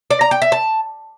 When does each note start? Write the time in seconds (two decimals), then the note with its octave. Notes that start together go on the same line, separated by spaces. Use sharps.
0.11 D5
0.21 A#5
0.31 G5
0.42 E5
0.52 A5